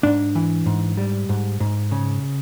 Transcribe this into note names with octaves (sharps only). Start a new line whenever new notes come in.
G#2 D4
E3
G#2
G3
G#2
G#2
C#3